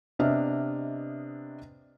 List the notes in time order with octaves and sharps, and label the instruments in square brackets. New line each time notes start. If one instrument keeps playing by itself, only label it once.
[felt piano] C3 B3 D4 D#5 E5 F6